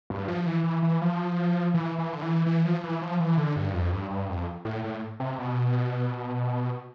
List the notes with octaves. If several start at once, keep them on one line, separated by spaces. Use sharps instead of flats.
G2
F3
E3
E3
E3
F3
E3
E3
D3
E3
E3
F3
E3
F3
E3
D3
G2
F2
G2
G2
F2
A2
A2
C3
B2